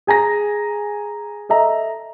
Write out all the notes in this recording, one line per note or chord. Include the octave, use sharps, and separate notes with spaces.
G#4 G#5 A#5 A#6
A4 D#5 E5 A#5